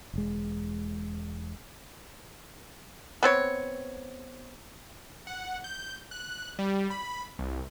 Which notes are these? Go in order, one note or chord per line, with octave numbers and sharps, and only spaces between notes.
E1 G#3
B3 C4 C#5
F#5
G6
F#6
G3
B5
C2